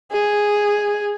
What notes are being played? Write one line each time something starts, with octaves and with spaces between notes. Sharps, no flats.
G#4